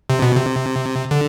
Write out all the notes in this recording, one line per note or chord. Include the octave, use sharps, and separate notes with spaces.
C3
B2
C3
D3